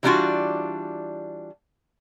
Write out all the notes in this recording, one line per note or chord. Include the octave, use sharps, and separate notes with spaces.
E3 F#3 G3 D4 F4 F#4